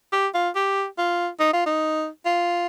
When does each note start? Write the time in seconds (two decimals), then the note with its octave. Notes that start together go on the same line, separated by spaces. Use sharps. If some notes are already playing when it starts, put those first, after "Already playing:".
0.13 G4
0.34 F4
0.56 G4
0.98 F4
1.40 D#4
1.53 F4
1.66 D#4
2.26 F4